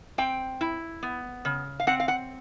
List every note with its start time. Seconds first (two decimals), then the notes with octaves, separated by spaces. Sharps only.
0.18 C4 G5
0.61 E4
1.03 B3
1.45 C#3
1.80 F5
1.87 C4 F#5
2.00 F5
2.08 F#5